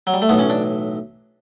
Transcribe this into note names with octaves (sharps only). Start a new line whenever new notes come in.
F#3
G3
A3
B1 A2 E3 B3
C#4
D4